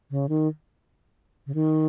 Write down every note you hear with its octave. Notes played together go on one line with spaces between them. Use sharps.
C#3
D#3
C#3
D#3